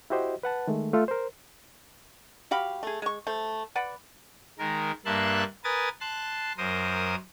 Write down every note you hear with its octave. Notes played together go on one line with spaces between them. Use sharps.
E4 F#4 G4 C5 D#5
B4 F#5 A5
D#3 G#3 A3
A3 F4 A4
A#4 C5
F#4 G4 F5 B5
A3 G#4
G#3 C#6
A3 C5
B4 D5 F#5 B5
D#3 G#3 A#4
G2 A#3 E5 A5 C6 F#6
A#4 B4 G#5 D#6 A6
A5 C6 F#6
F#2 A#4 C5 D#6